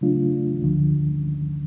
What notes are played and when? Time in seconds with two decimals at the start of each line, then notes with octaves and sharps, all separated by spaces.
0.01 C#3 F#3 A3 D4 F4
0.61 D2 D3 F3